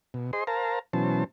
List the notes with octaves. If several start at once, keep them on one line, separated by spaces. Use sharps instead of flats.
B2
G#4 C5 D#5 C6
A#4 C5 F5 A5 A#5
B2 E3 F#3 C#4 C5 A5